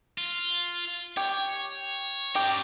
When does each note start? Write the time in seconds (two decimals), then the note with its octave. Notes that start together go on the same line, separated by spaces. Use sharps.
0.18 F4
1.17 G4 C#5
2.35 C#4 G4 A#5